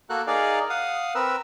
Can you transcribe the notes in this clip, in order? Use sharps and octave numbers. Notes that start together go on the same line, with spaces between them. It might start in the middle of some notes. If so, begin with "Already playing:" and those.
A#3 F#4 A4 A#4 F#6
D#4 G#4 A#4 D5 F5
F5 F#5 D#6
C4 A#4 B4 E6